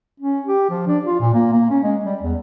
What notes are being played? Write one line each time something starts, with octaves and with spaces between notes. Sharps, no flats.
C#4
G4
F3
D4
F4
A#2
A#3
A#3
C#4
G#3
G3
E2